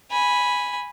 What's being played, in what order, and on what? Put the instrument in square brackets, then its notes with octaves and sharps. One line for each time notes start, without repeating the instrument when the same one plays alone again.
[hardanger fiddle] G#5 B5